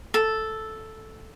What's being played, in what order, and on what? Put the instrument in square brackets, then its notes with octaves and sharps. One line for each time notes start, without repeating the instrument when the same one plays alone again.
[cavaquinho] A4